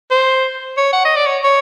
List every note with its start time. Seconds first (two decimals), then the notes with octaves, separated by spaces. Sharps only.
0.11 C5
0.78 C#5
0.93 F#5
1.05 D#5
1.16 D5
1.26 C#5
1.44 C#5